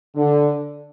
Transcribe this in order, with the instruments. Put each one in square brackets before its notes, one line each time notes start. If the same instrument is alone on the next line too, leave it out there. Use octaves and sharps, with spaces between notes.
[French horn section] D3